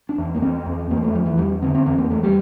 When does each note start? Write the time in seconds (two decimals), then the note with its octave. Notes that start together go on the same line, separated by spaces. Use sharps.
0.09 D4
0.18 E2
0.35 A#3
0.41 E2 C4
0.66 E2
0.90 E2 A#3
1.03 A3
1.14 E2 F3
1.26 E3
1.38 E2 G3
1.62 D3 C4
1.75 C4
1.86 E2 C4
1.98 A#3
2.10 E2 A3
2.23 G3